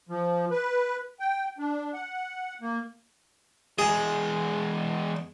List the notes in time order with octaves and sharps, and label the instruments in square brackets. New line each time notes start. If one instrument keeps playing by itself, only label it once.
[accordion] F3
B4
G5
D4
F#5
A#3
[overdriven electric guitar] E2 G#3 [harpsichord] G#4